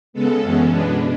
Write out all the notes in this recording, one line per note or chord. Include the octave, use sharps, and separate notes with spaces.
C#3 G#3 B3 A4
F#2 E3 G#3 B3 C#4
B2 G#3 B3 D4